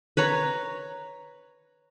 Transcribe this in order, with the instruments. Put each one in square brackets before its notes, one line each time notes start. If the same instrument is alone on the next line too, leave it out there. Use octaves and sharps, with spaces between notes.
[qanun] B4 C#5 A#5